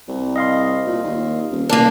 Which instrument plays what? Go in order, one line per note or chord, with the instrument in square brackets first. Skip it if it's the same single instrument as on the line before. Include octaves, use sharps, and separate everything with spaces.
[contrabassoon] C2
[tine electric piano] D#5 F5 C6
[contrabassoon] A#2
D#2
D#1
[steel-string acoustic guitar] A#3 D4 [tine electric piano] A#4 D5